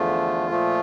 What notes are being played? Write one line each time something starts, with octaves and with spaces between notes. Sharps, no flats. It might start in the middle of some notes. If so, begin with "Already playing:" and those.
Already playing: E2 D3 F3 A3 F4
A#2 F3 A3